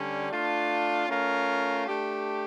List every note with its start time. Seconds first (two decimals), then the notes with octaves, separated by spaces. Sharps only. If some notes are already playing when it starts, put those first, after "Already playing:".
Already playing: D3 G3 C#4
0.31 A3 D4 F4
1.08 A3 C#4 F4 A#4
1.87 A3 D4 G4